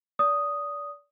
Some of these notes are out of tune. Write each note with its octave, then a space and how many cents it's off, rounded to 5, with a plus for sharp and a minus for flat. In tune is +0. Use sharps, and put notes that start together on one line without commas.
D5 -30 D#6 +0